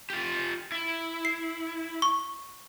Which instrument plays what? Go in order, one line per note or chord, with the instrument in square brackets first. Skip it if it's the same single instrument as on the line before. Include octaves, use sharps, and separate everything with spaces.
[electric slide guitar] F4 G4
E4
[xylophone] C7
C#6